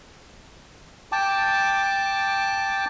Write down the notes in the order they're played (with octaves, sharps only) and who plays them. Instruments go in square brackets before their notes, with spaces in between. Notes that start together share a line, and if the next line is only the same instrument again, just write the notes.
[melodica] G5 A5 D6